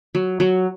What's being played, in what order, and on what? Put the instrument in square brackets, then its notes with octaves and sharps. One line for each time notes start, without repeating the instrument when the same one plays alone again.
[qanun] F#3
F#3